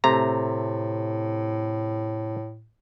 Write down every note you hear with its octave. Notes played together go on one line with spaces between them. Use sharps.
A2 C3 A3 A#5